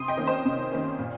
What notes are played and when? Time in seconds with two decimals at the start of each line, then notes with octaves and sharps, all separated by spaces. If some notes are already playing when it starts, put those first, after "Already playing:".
Already playing: C3 C6 D#6
0.08 D#5 G5
0.17 D#3 A#3 C#4
0.27 C5 D#5
0.45 C3
0.71 D#3 A#3 C#4
0.99 A#2